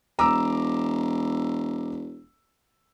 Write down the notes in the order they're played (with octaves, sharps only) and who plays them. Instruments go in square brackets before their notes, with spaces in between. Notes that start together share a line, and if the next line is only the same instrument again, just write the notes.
[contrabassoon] E1 [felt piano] A#5 D6 E6